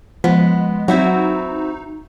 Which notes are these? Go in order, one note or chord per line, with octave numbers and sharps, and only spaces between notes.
F3 G#3 B3
F#3 C4 D#4 E4 F#4